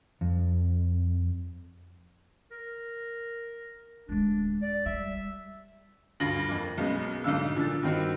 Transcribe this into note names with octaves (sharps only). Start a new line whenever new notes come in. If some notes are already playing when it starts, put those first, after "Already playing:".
F2
A#4
D1 G#3 D4
D5
G3 E5
D2 G2 F4 A#6 F#7
F2 A#3
B1 F#2 G#3 B3
B1 G#2 D3 F5 E6
A#2 D3 F3 E6 A6
G2 D#3 C4 F#4